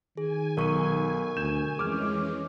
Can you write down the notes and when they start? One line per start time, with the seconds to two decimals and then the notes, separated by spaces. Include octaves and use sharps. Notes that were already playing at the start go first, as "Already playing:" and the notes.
0.17 D#3 G#4 G#5
0.57 B1 A#4 C#6 D#7
1.37 D2 G6 E7
1.78 F2 E3 G#3 C#4 G#4 D6 F6